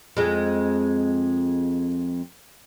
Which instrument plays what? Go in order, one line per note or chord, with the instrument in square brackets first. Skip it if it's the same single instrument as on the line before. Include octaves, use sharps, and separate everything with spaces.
[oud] F2 G#3